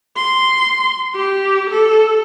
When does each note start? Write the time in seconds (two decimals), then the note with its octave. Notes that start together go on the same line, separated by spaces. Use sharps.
0.16 C6
1.15 G4
1.70 A4